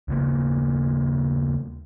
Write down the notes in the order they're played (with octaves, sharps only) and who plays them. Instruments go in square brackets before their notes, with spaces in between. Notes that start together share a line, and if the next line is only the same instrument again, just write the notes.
[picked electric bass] D#2 C#3 A#3